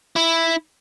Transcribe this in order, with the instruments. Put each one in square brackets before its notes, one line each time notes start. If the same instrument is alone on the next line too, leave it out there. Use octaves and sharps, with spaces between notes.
[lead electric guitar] E4